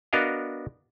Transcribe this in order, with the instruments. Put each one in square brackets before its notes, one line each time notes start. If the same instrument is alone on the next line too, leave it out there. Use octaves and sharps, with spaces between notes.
[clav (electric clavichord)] B3 D4 F#4 A#4 D#5 F5